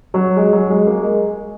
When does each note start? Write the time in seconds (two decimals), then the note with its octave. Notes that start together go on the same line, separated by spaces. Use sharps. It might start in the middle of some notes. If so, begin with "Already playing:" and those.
0.14 F#3
0.37 G#3
0.53 F#3
0.70 G#3
0.87 A#3
1.02 G#3